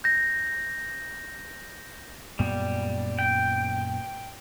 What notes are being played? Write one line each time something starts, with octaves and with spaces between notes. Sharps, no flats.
G6 A#6
F#2 A#2 G3 B3
G5